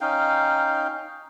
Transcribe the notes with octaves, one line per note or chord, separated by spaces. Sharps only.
C#4 D#4 F5 G5